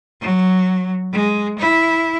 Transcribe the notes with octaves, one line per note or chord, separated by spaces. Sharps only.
F#3
G#3
E4